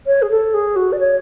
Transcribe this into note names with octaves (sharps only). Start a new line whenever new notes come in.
C#5
G#4
A4
G#4
F#4
D5
C#5